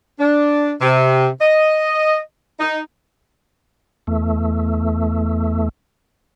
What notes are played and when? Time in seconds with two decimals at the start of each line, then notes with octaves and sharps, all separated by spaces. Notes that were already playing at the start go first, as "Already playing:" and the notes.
0.19 D4
0.81 C3
1.40 D#5
2.60 D#4
4.07 E2 A3